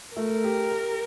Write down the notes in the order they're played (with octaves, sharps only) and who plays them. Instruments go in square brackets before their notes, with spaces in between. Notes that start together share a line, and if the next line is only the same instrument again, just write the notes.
[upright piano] A3 [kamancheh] A#4
[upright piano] G4
G4